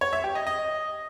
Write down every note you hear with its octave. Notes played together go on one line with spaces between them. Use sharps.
C#5
E5
G4
D#5
D#5